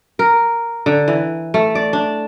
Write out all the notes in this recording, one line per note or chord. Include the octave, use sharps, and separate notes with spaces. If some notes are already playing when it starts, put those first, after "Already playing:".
A#4
D3
E3
A3
D5
D4